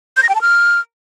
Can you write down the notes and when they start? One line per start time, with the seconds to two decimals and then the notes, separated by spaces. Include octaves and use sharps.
0.17 G6
0.23 A#6
0.29 G5
0.35 A5
0.41 F6